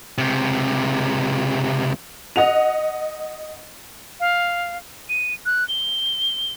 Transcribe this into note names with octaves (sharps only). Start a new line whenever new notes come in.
C#2 C3
D#5 F#5 F7
F5
D#7
F#6
G7